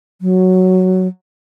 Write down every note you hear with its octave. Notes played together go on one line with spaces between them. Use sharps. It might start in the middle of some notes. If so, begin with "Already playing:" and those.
F#3